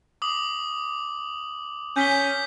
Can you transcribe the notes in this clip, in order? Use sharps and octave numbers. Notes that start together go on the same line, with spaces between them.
D6 D#6 F#7
C#4 G6 B6 G7